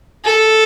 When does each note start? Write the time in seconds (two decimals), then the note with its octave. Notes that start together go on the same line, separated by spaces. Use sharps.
0.25 A4